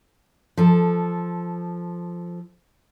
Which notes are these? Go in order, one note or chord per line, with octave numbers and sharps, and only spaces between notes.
F3 A4